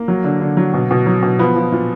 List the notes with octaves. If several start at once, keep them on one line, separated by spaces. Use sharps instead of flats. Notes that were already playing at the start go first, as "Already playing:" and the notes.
Already playing: A#3
F#3
D3
D3
F#3
B2
B2
F#3
B2
F3 B3
F3
A#2